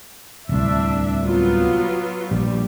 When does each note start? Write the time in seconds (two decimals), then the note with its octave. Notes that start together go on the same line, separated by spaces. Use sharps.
0.49 D1 C2 D4 E5
1.23 F#3 B3 F4
2.31 A#1 G3